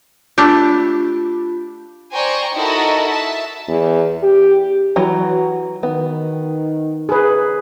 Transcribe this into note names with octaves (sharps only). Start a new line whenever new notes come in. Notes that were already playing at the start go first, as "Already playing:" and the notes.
A3 D4 F4 G4
C5 D5 G5 G#5 A#5 C#6
D#4 E4 F#4 A4 A#4 D#5
E5 A5
E2
G4
E3 F#3 F#4 A#5
D#3 B3
G#4 B4